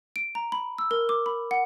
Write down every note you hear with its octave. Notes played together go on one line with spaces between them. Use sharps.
D7
A#5
B5
E6
A#4
D6
B5
F#5